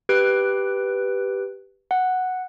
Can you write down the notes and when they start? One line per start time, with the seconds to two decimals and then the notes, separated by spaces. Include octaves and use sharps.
0.09 G4 B4 F#6 D7
1.91 F#5